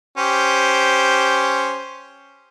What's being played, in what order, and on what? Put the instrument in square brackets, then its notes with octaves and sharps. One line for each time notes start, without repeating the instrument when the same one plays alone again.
[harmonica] C#4 G4 C5